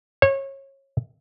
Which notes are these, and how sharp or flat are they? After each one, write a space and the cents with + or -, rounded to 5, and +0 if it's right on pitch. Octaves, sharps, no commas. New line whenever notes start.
C#5 -25